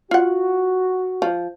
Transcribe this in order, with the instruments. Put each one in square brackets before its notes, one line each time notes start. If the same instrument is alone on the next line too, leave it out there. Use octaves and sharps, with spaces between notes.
[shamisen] F4 F#5 [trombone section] F#4
[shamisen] F3